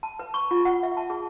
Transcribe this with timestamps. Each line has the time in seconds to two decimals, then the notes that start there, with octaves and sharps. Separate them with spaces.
0.03 A5
0.19 B4
0.34 C#6
0.51 F4
0.65 F#5
0.83 E5
0.97 A5
1.10 G#4